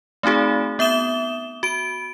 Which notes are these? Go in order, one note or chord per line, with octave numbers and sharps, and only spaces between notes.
A3 C4 D#4 F#4 G#4
B3 E5 D#6 E7 G7
F#4 D7